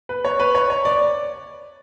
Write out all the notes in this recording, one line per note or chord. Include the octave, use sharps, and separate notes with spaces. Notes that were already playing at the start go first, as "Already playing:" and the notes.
B4
C#5
B4
C#5
C#5
D5